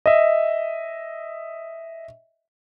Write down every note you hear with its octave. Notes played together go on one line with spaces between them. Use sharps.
D#5 E5